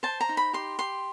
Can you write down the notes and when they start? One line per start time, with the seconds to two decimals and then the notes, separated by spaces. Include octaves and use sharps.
0.03 C5 A5
0.21 A#5
0.29 D#4
0.37 B5
0.53 G4 C6
0.79 G4 C6